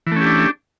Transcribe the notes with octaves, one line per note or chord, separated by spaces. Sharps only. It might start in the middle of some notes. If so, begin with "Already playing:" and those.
E3 A3 C#4 D4 G4